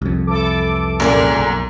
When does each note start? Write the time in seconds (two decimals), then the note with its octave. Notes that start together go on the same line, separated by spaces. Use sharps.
0.02 C2 F2
0.26 E3 A4 D6
1.00 F#2 A#2 G#4 A#4
1.39 B1